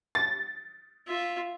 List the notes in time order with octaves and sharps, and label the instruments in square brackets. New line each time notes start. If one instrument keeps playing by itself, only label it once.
[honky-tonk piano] A6
[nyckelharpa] F4 E5